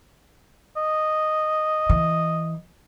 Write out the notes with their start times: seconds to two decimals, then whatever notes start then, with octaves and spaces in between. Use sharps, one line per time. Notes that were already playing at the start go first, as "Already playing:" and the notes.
0.77 D#5
1.90 E3